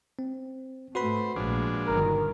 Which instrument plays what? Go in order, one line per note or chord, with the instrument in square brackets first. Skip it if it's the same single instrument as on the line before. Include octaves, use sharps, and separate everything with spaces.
[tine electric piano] C4
[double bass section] G#2 A3 [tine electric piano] F#4 B4 B5 [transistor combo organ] C5
[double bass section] A#1 [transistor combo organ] F3 G#3 D4
[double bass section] G1 D#3 [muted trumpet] A#4